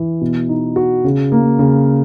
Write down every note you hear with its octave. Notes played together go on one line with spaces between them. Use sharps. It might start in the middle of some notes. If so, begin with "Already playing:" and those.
Already playing: E3
B2
D#4
F#4
C#3
A#3
C#3